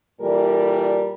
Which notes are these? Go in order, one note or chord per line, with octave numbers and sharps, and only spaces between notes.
A#2 E3 G3 A4 A#4 D5